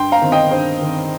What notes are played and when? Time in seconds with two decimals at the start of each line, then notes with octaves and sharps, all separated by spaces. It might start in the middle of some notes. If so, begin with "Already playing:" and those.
Already playing: G2 G5 C6
0.12 F5 A#5
0.22 D#3 C4
0.32 D#5 G5
0.51 G2 C5
0.82 D#3 C4